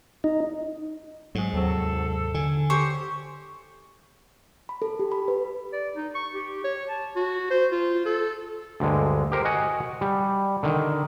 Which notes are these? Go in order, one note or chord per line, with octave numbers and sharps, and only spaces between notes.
D#4
G#2 F#3 G#3
D#2 C3 F#3 A4
D3 G#5
G4 C5 C#5 C#6
B5
A4
G4
B5
B4
D5
D#4
C#6
G4
C#5
A5
F#4
C5
F4
A4
D2 G2 D3 G#3
G4 A#4 C5
F#4 D#5 F#5 G#5
G3
D3 D#3